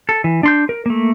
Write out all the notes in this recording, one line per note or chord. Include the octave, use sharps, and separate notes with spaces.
A4
E3
D4 C6 G6
A#4
A3 A#3